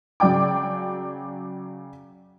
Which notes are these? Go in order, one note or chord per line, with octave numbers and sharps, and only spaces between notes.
C#3 F#3 D5 G5 D6